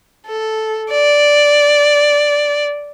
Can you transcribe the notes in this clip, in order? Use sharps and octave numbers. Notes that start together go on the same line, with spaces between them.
A4
D5